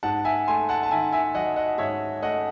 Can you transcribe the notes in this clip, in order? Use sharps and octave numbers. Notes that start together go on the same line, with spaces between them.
G#2 F#5 A5
E5 G#5
A3 G#5 C6
F#5 A5
A5
D#3 E5 G#5
E5 G#5
F#3 D#5 F#5
D#5 F#5
G#2 C#5 E5
A3 D#5 F#5